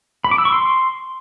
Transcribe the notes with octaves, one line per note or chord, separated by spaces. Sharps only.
B5
D6
E6
C#6
C6